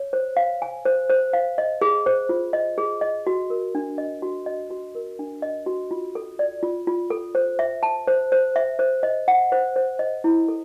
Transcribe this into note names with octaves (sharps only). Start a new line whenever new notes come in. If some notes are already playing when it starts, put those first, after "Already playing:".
Already playing: C#5
C5
F5
G#5
C5
C5
F5
D#5
G#4
C5
F4
D#5
G#4
D#5
F#4
A#4
D4
D#5
F#4
D#5
F#4
A#4
D4
D#5
F#4
F4
A4
D5
F4
F4
A4
C5
E5
A5
C5
C5
E5
C5
D#5
F#5
C5
C5
D#5
E4
A4